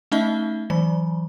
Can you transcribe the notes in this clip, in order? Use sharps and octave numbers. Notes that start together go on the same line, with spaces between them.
A3 C#4 D#4 D#5 E5 G7
E3 F#3 B5